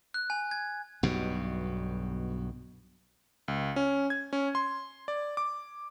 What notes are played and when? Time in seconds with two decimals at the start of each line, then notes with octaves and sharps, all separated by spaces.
0.14 F#6
0.30 G#5
0.51 G#6
1.03 B1 G2 B2
3.48 C#2
3.76 C#4
4.10 G#6
4.33 C#4
4.55 C6
5.08 D5
5.37 D6